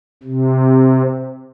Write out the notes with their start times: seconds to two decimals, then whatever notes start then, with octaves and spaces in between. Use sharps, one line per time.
0.23 C3